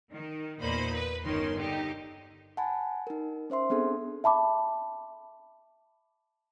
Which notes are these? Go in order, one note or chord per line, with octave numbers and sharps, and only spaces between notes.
D#3
E2 A#2 A#3 D#4 C5 B5
B4
G1 D#3 C#4 C6
D3 D#4 G4
F#5 G#5 A5 B5
D#4 A#4
C#4 C5 E5 C6
B3 C4 D4 G#4 A4
E5 A5 B5 D6